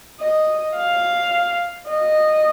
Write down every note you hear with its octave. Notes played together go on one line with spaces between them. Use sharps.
D#5
F5
D#5